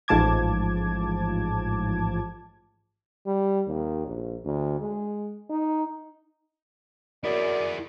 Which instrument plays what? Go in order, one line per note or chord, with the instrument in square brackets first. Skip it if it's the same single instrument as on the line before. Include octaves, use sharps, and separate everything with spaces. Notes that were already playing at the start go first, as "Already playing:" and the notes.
[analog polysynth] A1 G#2 F3 A5 D6 G#6
[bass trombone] G3
D#2
A#1
D2
G#3
D#4
[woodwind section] F#2 [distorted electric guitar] E4 G#4 [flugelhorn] D5